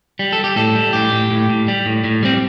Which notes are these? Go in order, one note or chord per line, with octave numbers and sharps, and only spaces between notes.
G3
A4
G3
G4
A2 A4
G3
A2 G4
A2
A2
A2
G3
A2
A2
G3 C4